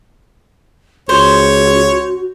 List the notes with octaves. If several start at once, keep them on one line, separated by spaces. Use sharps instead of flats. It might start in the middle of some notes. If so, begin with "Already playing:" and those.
C#2 F#4 C5 C#5